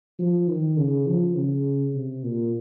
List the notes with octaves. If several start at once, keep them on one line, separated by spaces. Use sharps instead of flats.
F3
D#3
C#3
F3
C#3
C3
A#2